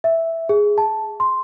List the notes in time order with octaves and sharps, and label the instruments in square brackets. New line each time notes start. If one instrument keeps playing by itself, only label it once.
[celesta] E5
G#4
A5
C6